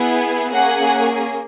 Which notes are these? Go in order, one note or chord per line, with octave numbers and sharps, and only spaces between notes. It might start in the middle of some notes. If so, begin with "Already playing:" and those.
Already playing: B3 E4 G#4
A#3 C#4 G#4 F#5